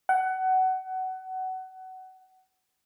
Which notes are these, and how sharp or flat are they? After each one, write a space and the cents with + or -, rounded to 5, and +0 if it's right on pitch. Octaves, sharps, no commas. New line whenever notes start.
F#5 +20